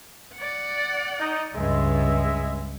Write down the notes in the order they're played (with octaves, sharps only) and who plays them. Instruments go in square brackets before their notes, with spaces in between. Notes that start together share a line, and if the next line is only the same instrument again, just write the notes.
[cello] D5 F#5
[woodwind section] D#4
[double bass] C#2 [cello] G2 [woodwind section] G#3 E5